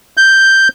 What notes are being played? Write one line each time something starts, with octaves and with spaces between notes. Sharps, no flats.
G6